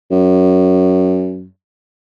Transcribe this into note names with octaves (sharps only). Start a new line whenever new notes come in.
F#2